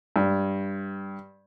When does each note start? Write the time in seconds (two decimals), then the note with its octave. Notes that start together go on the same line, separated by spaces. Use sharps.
0.16 G2